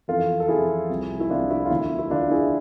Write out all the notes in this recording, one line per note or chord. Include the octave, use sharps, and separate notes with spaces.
F2 E3 F4 A4
A4
F2 E3 E4 G#4
C2 C3 F3
E4
C2 C3 F3 D4 F4
E4
F4
D2 D3 F3 E4
E4
D2 D3 F3 D4 F4
E4 G#4